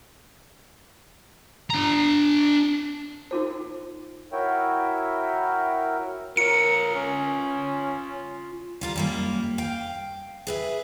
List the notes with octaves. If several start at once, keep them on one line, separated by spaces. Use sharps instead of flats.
D4 A#5
D#4 F4 C5
E4 F#4 A#4 C#5 E5 G5
F4 A#4 C#5 C#7
C#4
G3 F4 A#4
F#2 G3 A#3
F5 G5
G#4 B4 E5